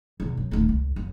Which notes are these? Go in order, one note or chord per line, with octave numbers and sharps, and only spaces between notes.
E2 B2
F#2
D#1 A3
C#2
F#1